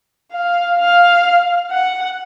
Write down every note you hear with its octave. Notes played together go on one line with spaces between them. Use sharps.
F5
F5
F#5